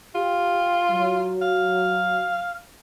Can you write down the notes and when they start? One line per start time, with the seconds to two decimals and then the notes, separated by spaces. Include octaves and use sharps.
0.15 F4 G4
0.90 F#3
1.42 F5